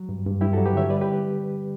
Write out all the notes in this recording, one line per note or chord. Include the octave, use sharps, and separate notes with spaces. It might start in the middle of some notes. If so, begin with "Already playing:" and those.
Already playing: F#3
G2
G2
G2 E4 G4
F#4 A4
F#3
G4 B4
D3 C#5 E5
G3 B4 D5
G4 B4